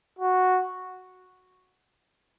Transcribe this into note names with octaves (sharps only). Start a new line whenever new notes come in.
F#4